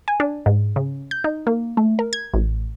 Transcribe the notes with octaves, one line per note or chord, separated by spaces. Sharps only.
G#5
D4
G#2
C#3
G6
D#4
A#3
A3
A#4
G#6
A1